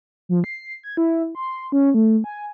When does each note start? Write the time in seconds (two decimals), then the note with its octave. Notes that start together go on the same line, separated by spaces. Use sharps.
0.29 F3
0.44 C7
0.84 G#6
0.97 E4
1.35 C6
1.72 C#4
1.94 A3
2.24 G#5